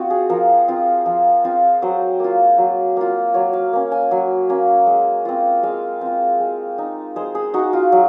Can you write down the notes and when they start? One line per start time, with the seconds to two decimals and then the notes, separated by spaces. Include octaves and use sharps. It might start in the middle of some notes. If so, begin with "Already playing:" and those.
Already playing: C4 F4 F#4 D#5
0.10 G#4
0.29 F3 A#4
0.68 C4 F4
1.06 F3
1.44 C4 F4
1.82 F#3 C5
2.20 A#3 F4
2.58 F#3
2.97 A#3 F4
3.34 F#3 C#5
3.53 F5
3.73 A#3 C#4
3.92 G#5
4.11 F#3
4.49 A#3 C#4
4.87 G#3
5.25 C4 F4
5.63 G#3 F5
6.01 C4 F4
6.40 G#3
6.78 D#4
7.16 G#3 C5
7.35 G#4
7.54 D#4 F#4
7.73 F4
7.92 F#3